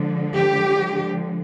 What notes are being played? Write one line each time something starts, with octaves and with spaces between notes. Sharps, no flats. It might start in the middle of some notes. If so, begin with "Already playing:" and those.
Already playing: D3 F3 G#3
G4